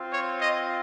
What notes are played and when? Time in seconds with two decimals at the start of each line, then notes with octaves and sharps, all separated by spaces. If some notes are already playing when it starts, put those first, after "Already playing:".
Already playing: C4 F4
0.11 C#5
0.40 D#5